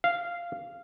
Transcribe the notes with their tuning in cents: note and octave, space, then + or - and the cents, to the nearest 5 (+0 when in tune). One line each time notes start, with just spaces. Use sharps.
F5 -10